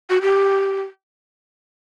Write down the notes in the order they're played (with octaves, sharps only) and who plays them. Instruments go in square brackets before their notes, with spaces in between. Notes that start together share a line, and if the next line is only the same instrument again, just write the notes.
[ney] F#4
G4